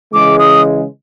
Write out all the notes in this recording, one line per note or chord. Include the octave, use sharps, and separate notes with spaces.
C#3 E3 G#3 D6
D#6